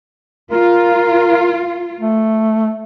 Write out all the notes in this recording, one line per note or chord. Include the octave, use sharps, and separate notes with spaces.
F4 A#4
A3